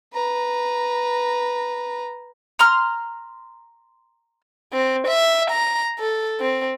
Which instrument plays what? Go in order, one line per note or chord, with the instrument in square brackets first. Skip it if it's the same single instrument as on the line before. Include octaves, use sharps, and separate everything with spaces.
[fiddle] B4 A#5
[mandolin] A#5 C6 F6
[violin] C4
E5
A#5
A4
C4